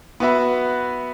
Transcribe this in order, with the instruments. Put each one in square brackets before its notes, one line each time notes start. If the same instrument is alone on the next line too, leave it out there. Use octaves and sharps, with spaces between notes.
[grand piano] B3 F#4 B4 E5